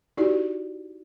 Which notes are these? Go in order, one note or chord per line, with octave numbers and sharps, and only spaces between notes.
D#4 E4 F#4 G4 D5